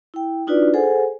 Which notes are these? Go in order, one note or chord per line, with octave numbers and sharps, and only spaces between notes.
E4 G5
D4 D#4 F4 F#4 B4 D5
G#4 A4 C5 F#5 G#5